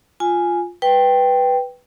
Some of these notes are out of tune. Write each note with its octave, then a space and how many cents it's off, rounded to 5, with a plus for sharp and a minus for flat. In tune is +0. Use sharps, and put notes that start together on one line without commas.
F4 +0 G#5 +0
B4 +0 G5 +0